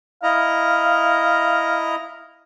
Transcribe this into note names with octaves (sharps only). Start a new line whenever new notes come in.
E4 D#5 F5 A#5